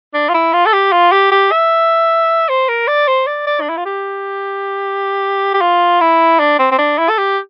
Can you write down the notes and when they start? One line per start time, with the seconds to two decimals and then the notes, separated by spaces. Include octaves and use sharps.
0.14 D4
0.29 F4
0.34 E4
0.53 F4
0.66 A4
0.73 G4
0.92 F4
1.12 G4
1.31 G4
1.51 E5
2.49 C5
2.69 A#4
2.88 D5
3.08 C5
3.27 D5
3.47 D5
3.61 D4
3.69 E4
3.77 F4
3.86 G4
5.54 G4
5.61 F4
6.01 E4
6.39 D4
6.59 C4
6.72 C4
6.78 D4
6.98 E4
7.09 A4
7.18 G4